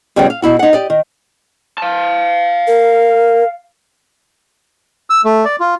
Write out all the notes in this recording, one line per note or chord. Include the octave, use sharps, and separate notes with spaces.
F2 C#3 G3 B3 C#4 G5
F5
B2 E4 F#4
D#4 F#5
G4 D5 D#5
D#3
F5 A5
A#4
E6
A3
D5
F4